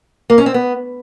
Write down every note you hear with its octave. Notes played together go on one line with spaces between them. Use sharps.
A#3
C#4
C4
B3